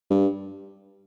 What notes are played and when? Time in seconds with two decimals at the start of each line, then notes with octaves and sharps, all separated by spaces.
0.10 G2